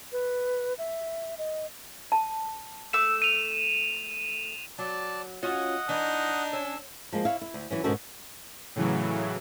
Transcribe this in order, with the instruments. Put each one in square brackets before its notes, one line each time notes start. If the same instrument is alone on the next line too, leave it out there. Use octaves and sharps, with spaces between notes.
[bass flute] B4
E5
D#5
[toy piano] A5
[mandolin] A3 D6 E6 [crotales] E7
[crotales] D#7 F7
[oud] F#3 [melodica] D5 A5
[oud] C#4 F4 F#4 [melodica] D#5 F#5
[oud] E3 [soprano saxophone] D4 [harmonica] D#4
[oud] C#4 [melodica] E6
[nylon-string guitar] F3 G#3 A#3
E4 C#5 F5
E4
D2
E3 F#3 C#4
G#2 B2 D#3 C#4 F#4 A4
[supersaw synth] A2 C#3 E3 F#3